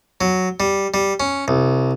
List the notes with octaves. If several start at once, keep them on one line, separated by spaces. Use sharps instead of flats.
F#3
G3
G3
C#4
C2